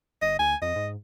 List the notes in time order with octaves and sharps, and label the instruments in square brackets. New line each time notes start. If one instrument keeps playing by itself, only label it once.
[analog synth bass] G1 [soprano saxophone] D#5
[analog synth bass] D2 [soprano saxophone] G#5
[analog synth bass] F2 [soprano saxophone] D#5
[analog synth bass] G#2